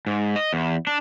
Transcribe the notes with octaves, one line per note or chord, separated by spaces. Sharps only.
G#2
D#5
E2
D4